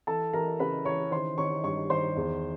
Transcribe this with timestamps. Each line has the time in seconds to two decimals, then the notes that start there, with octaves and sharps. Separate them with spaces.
0.07 E3 A4 A5
0.33 E3 A#4 A#5
0.60 C#3 B4 B5
0.85 E3 C#5 C#6
1.11 D#3 C5 C6
1.38 D#3 C#5 C#6
1.64 G2 C#5 C#6
1.90 D#3 C5 C6
2.16 E2